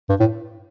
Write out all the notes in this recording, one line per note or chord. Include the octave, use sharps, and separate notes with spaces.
G2
A2